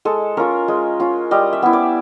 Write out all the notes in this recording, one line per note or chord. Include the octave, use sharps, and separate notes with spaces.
G#3 A4
C#4 F4 A#4
G#3
C#4 F4
G3 D#5
E5
B3 E4
D5